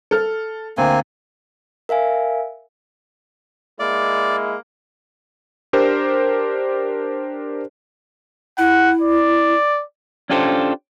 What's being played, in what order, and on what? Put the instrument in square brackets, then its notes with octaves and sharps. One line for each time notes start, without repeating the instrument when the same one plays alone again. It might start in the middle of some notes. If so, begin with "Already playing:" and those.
[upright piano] A4 F6
[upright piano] D2 [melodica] A#3 C4 G#5
[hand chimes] A#4 E5 F5 G#5
[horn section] G#3 A#3 E4 [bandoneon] D5
[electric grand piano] D4 G4 A#4 C5
[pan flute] E4 [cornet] F#5
[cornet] D5
[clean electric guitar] C#4 D4 F4 G4 A4 C5